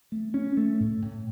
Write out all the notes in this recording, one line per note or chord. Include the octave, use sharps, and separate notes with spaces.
A3
C#4
A3
A2
A2